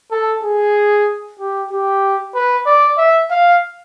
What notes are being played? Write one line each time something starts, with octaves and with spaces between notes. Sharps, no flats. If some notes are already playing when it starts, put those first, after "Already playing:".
A4
G#4
G4
G4
B4
D5
E5
F5